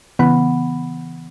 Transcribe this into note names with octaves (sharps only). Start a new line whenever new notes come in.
C#3 E3 B3 F#5 B5